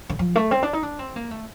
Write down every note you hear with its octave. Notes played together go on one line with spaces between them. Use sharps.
D3
F3
A3
C4
D4
D#4
D4
C4
A#3
A3